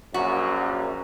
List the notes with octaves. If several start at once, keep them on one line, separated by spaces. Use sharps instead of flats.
A#1 F#2 F#4